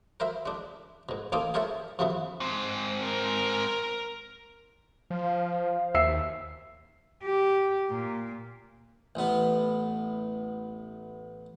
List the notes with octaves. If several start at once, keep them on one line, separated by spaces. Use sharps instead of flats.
A#4 C5 E5 B5
G#3 D4
G#2 B2
A1 A#3 D#4 A4 C5 D6
G#4 A#4 C5 C#5 E5 A5
G2 C#3 E3 F3 B3 E4
G#2 C4
A#4
F3 C5 F5
D#2 E5 E6 C7
G4
A#2
A1 B3